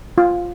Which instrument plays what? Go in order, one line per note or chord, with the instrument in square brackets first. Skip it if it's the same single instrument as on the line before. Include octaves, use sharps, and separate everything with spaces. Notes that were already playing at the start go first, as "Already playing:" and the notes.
[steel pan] F4